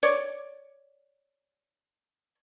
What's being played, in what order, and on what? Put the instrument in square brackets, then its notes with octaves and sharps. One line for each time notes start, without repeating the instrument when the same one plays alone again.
[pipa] C#5 D5